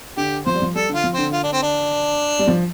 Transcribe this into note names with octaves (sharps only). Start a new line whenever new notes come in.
D3 G4
F3 C5
G3
F3
G3 A4
D3 F4
F3
D3 C4
F4
D4
C4
D4
G3
F3